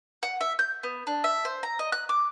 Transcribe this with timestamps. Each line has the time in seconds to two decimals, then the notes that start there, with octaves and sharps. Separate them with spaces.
0.23 F#5
0.41 E5
0.59 G6
0.83 B3
1.07 D4
1.24 E5
1.45 C5
1.63 A#5
1.79 D#5
1.92 F#6
2.09 D6